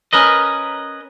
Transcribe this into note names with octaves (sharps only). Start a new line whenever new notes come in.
C#4 A#4 B4 D#5